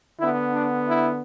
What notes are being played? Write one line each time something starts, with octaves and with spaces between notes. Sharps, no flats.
D3 B3 E4
D4
E4